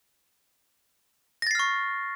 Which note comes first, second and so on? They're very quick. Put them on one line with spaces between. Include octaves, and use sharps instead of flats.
A#6 A6 C7 F6 C#6